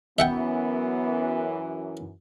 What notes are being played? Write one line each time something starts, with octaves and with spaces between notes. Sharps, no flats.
F#2 E3 B3 E5 F#5 G5